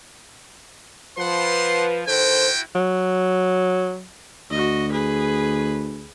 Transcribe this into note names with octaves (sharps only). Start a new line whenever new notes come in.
F3 B4 F#5 C6
D#3 E4 F#4 A4 C5 G5
F#3
D2 F#4 D#5
G#4 B4